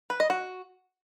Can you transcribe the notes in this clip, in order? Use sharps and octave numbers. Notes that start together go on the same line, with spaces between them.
B4
D#5
F#4